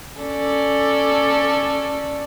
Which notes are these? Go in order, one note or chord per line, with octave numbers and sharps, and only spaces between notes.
C#4 A4 D5